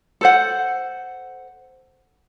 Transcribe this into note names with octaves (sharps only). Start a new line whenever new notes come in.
A4 C5 F#5